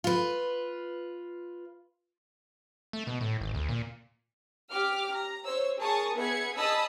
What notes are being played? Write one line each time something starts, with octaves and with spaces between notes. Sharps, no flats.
F4 B4
A3
B2
A2
G#1
D2
A#2
G4 D6 F6
A#5
C5 C#5 E6
G#4 A#4 A5 C#6 D#6
B3 G#4 E5 G#6 C#7
G#4 D#5 A5 B5 D#6 E6